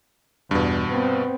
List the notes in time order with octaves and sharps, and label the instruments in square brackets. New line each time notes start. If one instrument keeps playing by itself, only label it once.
[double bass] E2 [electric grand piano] G2 B2
[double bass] B3 C4